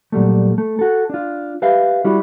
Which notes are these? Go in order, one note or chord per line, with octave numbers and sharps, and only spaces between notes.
A#2 F#3 G3 A3
A3
F#4 A4
D4 F4
G4 B4 E5 F5
G3 E4 F#4